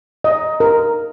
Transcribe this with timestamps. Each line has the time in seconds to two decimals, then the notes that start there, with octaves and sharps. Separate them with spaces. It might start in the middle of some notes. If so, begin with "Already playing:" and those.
0.24 D#5
0.60 A#4